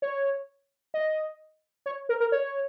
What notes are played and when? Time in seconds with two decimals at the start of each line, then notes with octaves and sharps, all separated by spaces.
0.02 C#5
0.94 D#5
1.86 C#5
2.09 A#4
2.20 A#4
2.32 C#5